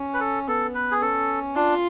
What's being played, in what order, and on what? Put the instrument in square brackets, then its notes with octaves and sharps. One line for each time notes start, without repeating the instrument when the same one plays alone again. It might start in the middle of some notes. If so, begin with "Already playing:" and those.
Already playing: [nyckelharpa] C#4
[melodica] B4
A4
[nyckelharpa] B3 [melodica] A4
[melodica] B4
G#4
[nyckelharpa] C#4 [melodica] A4
[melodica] D4 [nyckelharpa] F4